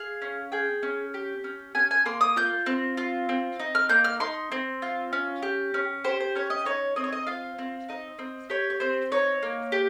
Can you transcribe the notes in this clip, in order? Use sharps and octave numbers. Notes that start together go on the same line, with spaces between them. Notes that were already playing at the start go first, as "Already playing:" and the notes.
Already playing: G#4 F5
C#4
G#4 G5
C#4
G4
C#4
C#4 G#5
G#5
A#3 C6
D#6
F4 G6
C4
F4
C4
D#4
F6
A#3 G6
F6
D#4 C6
C4
F4
C#4
G4
C#4
G4 C5
C5
C#4 C#5
D#5
D#4 C#5
C4 D#5
C#5
D#5
F4 F5
C4
D#4 D#5
C4
G4 C#5
C#5
C4 C5
D#4 C#5
A#3
G4